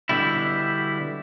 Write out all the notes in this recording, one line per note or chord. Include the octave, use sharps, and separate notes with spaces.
B2 D3 G3 E4